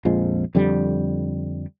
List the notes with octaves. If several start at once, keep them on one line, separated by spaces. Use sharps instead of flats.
A#1 F2 F3 G#3
F2 D3 G3